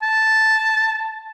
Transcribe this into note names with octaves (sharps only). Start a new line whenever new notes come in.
A5